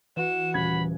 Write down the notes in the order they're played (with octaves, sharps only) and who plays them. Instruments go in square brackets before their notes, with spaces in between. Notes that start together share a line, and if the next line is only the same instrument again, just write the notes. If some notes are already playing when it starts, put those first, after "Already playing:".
[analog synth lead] E3 [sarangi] F#4 [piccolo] E7
[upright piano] D#1 C#3 G#6 [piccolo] B5